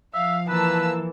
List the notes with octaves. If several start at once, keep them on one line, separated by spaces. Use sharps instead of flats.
F3 E5 F5
E3 A#3 B4 A5 E6